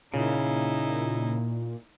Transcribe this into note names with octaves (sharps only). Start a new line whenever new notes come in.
A#2 C#3 D#4 E4